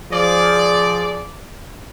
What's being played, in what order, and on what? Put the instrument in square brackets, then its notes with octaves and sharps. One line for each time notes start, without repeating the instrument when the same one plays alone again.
[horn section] F3 G#4 D5